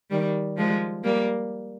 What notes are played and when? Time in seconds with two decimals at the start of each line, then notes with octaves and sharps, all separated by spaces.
0.10 D#3 G3
0.57 F3 G#3
1.04 G3 A#3